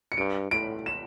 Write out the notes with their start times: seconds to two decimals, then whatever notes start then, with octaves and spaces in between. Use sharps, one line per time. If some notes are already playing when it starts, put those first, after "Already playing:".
0.12 C#7
0.17 G2 D7
0.51 A2 D7
0.86 E7